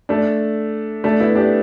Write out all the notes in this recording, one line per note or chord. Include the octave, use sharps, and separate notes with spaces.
A3 D4
A3 D4
B3 E4
D4 G4